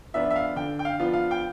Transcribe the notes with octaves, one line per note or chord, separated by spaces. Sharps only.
F3 B3 D4 F4 E5
E5
F5
D3 G5
G5
F5
F3 B3 D4 F4
F5
G5